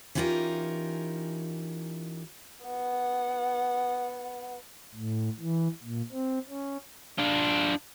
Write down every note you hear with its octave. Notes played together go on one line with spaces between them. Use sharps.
E3 C#4 D#4 F4 G4 A#4
B3 F#5
A2
E3
A#2
C4
C#4
D4 F4